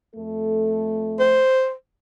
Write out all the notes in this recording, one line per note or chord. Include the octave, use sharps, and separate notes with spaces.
F2 A3 A4
C5